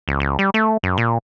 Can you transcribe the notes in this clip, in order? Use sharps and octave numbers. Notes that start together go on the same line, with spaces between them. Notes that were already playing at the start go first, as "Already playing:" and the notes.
C#2
C#2
G3
A3
F#2
A#2